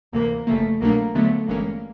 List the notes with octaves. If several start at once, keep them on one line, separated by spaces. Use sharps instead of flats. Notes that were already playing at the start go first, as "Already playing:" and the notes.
D2 C3 E3 A#3
G1 F2 C#3 F3 A3 A#3
C2 B2 F#3 A3 A#3 D4
D#2 D3 F#3 A3 B3
G1 G2 E3 G#3 A#3 C#4